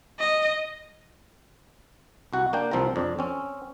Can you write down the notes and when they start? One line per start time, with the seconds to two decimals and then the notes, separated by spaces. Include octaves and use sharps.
0.19 D#5
2.33 C2 F#4 F#5
2.53 A#3 D4 G5
2.71 C2 F3 C4 F4 A#4 A#5
2.96 F2 D4
3.19 C4 C#4